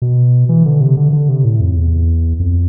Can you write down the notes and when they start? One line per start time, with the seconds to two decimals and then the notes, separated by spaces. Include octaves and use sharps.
0.02 B2
0.49 E3
0.65 D3
0.81 C3
0.97 D3
1.13 D3
1.29 C3
1.45 A2
1.60 F2
1.76 E2
2.40 F2